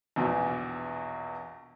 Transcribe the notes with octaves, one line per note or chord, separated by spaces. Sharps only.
A#1 E2 B2